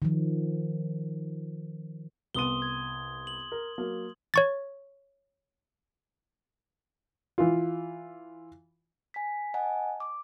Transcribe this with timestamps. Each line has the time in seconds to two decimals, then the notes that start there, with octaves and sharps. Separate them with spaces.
0.02 D#3 F3
2.35 C2 B3 C6 D#6 D#7 G7
2.62 G#6
3.27 F#7
3.52 A#4
3.78 F#3 A#3
4.34 C#5 C#6 A6
7.38 E3 F4
9.14 G#5 B6
9.54 D#5 F#5 G#5 A5
10.00 D6